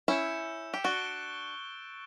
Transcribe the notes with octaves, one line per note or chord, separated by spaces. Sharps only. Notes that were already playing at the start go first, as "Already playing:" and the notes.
C#4 E4 E6 G6 C#7 E7
G4
D4 F#4 C#6 F#6 A6 D7 G7